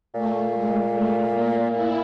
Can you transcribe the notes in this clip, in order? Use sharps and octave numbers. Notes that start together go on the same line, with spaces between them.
A#2 A3
G#3
A3
A#3
A#2 E4